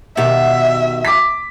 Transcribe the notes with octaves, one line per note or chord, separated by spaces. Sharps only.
B2 D#3 G4 E5
D6 B6